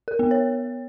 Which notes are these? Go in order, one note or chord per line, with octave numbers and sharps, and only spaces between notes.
A#4
B3
C#5